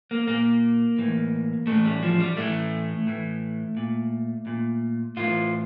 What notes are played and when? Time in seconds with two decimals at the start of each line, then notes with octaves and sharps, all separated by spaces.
0.11 A#3
0.27 A#2 A#3
0.98 A2 E3
1.67 A2 E3 A3
1.85 G3
2.03 F3
2.20 G3
2.37 A2 E3 A3
3.07 A2 E3
3.77 A#2
4.47 A#2
5.17 A2 E3 F4